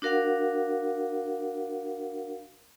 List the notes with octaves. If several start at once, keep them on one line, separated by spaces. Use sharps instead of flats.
D4 F#4 A#4 F5 F#5